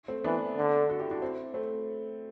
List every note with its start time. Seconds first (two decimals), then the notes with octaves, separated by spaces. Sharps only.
0.08 A3 C4
0.24 E3 B3 D4
0.57 D3
0.89 F#4 A4
1.00 E4 G4
1.11 D4 F#4
1.22 C4 E4
1.54 A3 C4